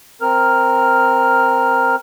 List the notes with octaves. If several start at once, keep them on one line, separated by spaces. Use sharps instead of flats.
C4 A#4 F6